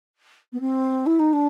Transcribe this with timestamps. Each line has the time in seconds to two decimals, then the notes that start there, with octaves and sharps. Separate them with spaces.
0.53 B3
0.60 C4
1.06 E4
1.19 D#4
1.33 D4